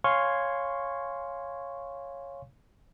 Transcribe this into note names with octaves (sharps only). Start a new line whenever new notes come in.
C#5 F5 G#5 C6 C#6 G#6